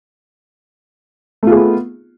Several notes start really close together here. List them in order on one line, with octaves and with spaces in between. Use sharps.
A3 F4 G#4 B3